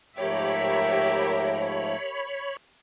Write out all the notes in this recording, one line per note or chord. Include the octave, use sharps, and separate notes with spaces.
G#2 F3 A3 G4 A#4 C#5 E5 B5